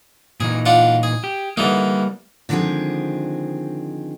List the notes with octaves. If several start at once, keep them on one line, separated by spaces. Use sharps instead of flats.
A#2 E3 D#4 G#4
D4 F4 F#5
G#4
G4
D3 E3 G3 A#3 D#4
D3 D#3 F3 G#3 C4 G#4